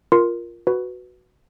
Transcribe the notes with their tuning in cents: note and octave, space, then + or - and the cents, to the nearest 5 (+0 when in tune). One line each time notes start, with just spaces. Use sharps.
F4 +0 A#4 +5 C6 +0
F#4 +0 B4 +0